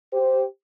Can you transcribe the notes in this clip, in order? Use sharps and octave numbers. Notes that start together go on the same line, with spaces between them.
G4 C5